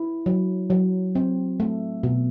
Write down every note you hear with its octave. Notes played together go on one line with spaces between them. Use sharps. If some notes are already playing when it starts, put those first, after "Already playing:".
Already playing: E4
F#3
F#3
C4
A3
B2